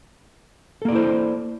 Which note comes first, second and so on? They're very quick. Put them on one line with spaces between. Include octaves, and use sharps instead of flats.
A4 A#3 D5 E4 C5